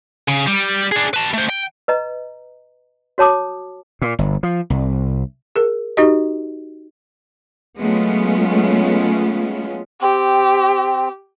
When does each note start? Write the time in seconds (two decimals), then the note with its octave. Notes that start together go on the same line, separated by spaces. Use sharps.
0.28 C#3
0.46 G3
0.92 D4 G#4
1.14 B4 A5
1.34 A3 C5
1.49 G5
1.88 B4 D#5 A#5
3.18 F#4 C#5 A5 D6 D#6
4.02 A#2
4.19 G1
4.43 F3
4.70 C2
5.56 G#4 A#4
5.97 D#4 F#4 G4 D#5
7.80 F#3 G#3 A3 B3 C#4 F4
10.02 C4 G4